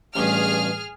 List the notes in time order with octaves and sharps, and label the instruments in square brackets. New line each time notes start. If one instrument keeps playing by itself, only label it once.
[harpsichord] A1 G2 [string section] G#4 F6